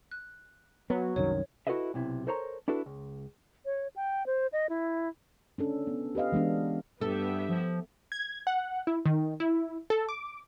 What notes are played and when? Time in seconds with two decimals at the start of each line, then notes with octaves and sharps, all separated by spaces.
0.11 F#6
0.90 F#3 B3
1.16 C2 F#2 D#3 C#5
1.67 E4 F#4 A4 B4 D#5 E5
1.94 B1 C3 E4
2.27 A4 A#4 C5 C#5 E5 A#5
2.68 D4 E4 F#4 A4 B4
2.86 C#2
3.65 C#5
3.96 G5
4.26 C5
4.53 D#5
4.69 E4
5.58 C#4 D4 A4
5.87 B3
6.15 G4 B4 D#5 F5
6.32 E3 G#3 B3 D4
7.01 G2 B3 G4 A4 E5
7.49 F3
8.12 G#6
8.47 F#5
8.87 E4
9.06 D#3
9.40 E4
9.90 A4
10.09 D6